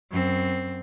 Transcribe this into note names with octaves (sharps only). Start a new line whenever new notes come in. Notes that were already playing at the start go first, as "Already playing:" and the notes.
F#2 C4